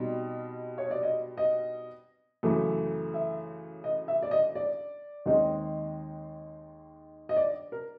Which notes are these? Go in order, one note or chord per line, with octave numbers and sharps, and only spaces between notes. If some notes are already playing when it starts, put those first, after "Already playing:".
Already playing: B2 G3 C4 D#4
C#5
D5
D#5
D#5
F#2 C#3 E3 A3
E5
D#5
E5
D5
D#5
D5
D#2 D#3 G#3 C4 D#4
D#5
D5
A#4